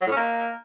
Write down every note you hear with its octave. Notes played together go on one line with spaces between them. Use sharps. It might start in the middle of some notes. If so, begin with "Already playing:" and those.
F#3
A2
C#4
A#3